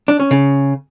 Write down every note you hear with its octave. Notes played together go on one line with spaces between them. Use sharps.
D4
C#4
C#3